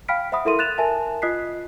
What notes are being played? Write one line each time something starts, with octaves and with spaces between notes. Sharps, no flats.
F5 G5 B5 F6 B6 D7
C5 E5 F#5 B5 D#6
E4 A4 A#4 E5 C6 D#7
F#6 A6 E7 F7
A#4 E5 G#5 A5
F4 D#5 D#6 F#6 B6 C7